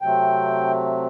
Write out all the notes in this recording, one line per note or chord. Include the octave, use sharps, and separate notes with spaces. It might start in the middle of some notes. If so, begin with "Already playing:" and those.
C3 F#3 A3 C4 G5